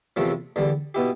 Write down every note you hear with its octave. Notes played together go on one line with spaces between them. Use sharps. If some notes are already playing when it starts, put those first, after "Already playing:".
E2 C3 F3 A3 C4
E2 D3 G3
B2 B3 E4 G4